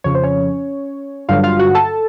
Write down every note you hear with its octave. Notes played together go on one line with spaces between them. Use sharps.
F2 C#3 F3 C#5
C5
C#4 C#5
G2 D3 F#3 F4 F5
F4 F5
F#4 F#5
A4 A5